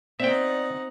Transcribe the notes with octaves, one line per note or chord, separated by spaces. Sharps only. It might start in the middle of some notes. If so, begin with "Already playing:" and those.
C4 D#4 D5 E5 F#5 G5